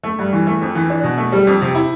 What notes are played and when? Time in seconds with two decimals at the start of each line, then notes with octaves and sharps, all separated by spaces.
0.03 A3
0.19 G2
0.33 E3
0.47 A3
0.62 F2
0.75 E3
0.90 D4
1.04 B2
1.18 A3
1.32 G3
1.47 F2
1.62 C3
1.75 E4